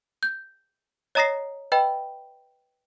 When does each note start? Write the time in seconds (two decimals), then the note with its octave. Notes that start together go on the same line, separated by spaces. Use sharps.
0.23 G6
1.15 C#5 D#5 A#5 D#6 A#6 C7
1.72 B4 D#5 G5 B5